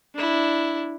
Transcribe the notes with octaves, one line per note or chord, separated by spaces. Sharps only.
D4 E4